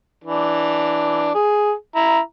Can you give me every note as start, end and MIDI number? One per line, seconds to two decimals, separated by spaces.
0.24 1.31 52
0.24 1.31 62
1.35 1.72 68
1.95 2.19 64
1.95 2.19 82